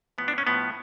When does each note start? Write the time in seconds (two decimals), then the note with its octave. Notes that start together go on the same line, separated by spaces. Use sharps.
0.18 A2 F3 B3
0.28 D4
0.38 C#4
0.47 A2 F3 B3